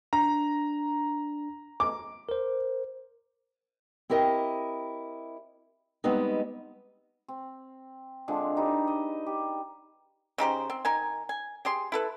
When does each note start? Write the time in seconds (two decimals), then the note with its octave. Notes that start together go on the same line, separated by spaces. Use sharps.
0.13 D4 A#5
1.80 D6
2.29 A#4 C5
4.10 C4 E4 G4 A#4 D#5
6.04 G3 G#3 B3 C4 D#4
7.28 C4
8.28 D3 F3 G#3 C4
8.56 D4 D#4 G4 B4
8.87 D#5
9.27 G4
10.38 C#3 D#4 G4 C5
10.70 C4
10.85 D#3 D#4 G#5
11.29 G#5
11.65 G4 G#4 C6
11.92 E4 A4 B4